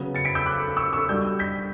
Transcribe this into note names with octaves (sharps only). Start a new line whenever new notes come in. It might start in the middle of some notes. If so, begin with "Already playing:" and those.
Already playing: C#3 F#3 B3
A6 C#7
B6 D7
E6 G6
D6 F#6
C#6 E6
C#6 E6
B2 G3 D4 E6 G6
G6 B6